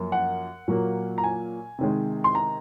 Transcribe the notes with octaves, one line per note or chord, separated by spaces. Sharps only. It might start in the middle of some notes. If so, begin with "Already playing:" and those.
Already playing: F#2 F3 A#3
F#5
A#2 F#3 A#3
A#5
G#5
C3 D#3 G#3
C6
A#5